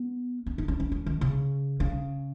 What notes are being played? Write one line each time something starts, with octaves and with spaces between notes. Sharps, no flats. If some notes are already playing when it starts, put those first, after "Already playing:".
Already playing: B3
C#4
D#4
C#4
C#4
C#4
D#3
C#3
C#3